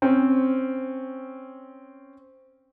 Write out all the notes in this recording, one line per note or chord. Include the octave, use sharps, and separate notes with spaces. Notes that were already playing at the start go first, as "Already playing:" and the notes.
C4 C#4